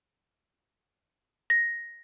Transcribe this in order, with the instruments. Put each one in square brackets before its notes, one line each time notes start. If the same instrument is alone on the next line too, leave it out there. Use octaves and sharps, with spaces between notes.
[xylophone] A#6